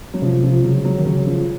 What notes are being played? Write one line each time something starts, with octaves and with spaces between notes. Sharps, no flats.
F#3
C3 F3
F3
C#3 F#3
F#3
D#3
C#3 F#3
F3